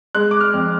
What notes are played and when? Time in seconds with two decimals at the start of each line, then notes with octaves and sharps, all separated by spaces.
0.15 G#3 F#6
0.31 D6
0.41 F6
0.54 F2